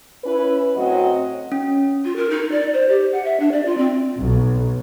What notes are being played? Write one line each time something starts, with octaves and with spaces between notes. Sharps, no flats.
C#4 E4 B4
A2 F#3 C4 F#4 D#5
C#4
F4
A#4
D#4
D5
C5
G4
F#5
E5
D4
D5
F4
C4
B1